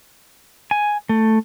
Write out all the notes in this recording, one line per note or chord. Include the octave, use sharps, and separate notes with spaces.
G#5
A3